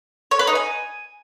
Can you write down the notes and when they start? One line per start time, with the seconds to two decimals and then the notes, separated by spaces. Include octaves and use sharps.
0.31 C#5
0.39 B4
0.47 D#4
0.55 G#5